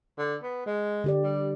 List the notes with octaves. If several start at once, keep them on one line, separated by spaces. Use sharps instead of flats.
D3
B3
G#3
D3 G4 D5
G3